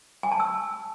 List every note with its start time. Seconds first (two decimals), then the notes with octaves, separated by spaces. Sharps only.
0.23 G#5
0.32 A5
0.40 E6